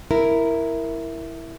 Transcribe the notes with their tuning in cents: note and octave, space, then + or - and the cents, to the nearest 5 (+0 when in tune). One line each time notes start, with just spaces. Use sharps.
E4 +0 A#4 +0